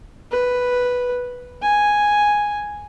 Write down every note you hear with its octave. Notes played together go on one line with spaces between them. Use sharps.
B4
G#5